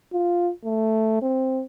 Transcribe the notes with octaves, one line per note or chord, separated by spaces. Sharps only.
F4
A3
C4